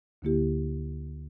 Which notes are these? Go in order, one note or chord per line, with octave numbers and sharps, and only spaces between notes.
D2 D3 A#3 E4 G4